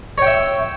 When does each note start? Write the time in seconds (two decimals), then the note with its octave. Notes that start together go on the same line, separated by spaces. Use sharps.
0.18 C#5
0.22 G5
0.27 E5